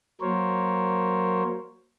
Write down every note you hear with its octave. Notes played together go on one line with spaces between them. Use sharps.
F#3 A#3 A#4 C5 C#5